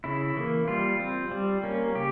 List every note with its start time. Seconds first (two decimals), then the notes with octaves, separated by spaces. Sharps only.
0.04 C#3 E4
0.37 E3 A#3
0.68 G3 F4
0.99 C4
1.31 G3
1.63 A#3 C#4
1.95 C#3 G4